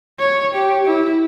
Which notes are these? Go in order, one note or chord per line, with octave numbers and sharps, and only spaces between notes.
C#5
G4
E4